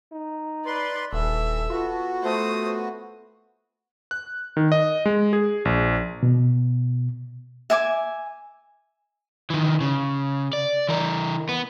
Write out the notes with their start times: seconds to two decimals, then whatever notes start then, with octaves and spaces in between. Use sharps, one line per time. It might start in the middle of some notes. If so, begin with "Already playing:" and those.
0.12 D#4
0.66 B4 D5 C6
1.13 D#1 E3 A4 E5
1.70 B3 F4 F#4
2.23 A3 C5 D#6
4.11 F#6
4.57 D#3
4.72 D#5
5.06 G#3
5.33 G#4
5.65 A#1
6.23 B2
7.70 E5 G#5 D6
9.50 D#3 E3
9.81 C#3
10.53 D5
10.89 E3 A#4
11.49 B3